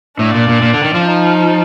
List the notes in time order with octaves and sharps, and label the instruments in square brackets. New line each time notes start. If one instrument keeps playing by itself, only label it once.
[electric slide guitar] A2 [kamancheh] D4
[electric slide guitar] A#2
A#2
A#2
D3
D#3
F3
[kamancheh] D#4